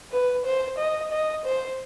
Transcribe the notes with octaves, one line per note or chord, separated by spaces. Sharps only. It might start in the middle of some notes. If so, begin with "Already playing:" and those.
B4
C5
D#5
D#5
C5